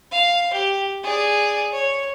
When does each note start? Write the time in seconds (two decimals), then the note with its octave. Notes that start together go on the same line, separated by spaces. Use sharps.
0.11 F5
0.52 G4
1.03 G#4 D5
1.72 C#5